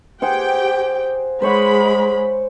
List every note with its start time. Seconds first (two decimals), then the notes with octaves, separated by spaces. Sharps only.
0.22 G4 G#4 C5 F#5 G5
1.42 G#3 G#4 C5 C#5 F#5 B5